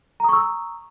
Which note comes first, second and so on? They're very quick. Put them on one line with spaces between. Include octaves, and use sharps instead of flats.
A#5 D#6 C#6 E6